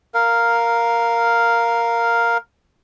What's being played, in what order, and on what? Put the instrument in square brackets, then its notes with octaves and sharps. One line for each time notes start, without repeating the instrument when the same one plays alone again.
[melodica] A#4 F5